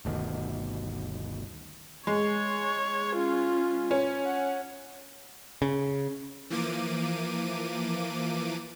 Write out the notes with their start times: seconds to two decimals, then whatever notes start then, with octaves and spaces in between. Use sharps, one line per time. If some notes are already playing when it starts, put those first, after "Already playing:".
0.05 G1 D2 B2 D#3
2.07 G#3 C#5
3.15 C#4 F4
3.91 C#4
4.25 F#5
5.62 C#3
6.50 E3 F3 A#3 D6 D#7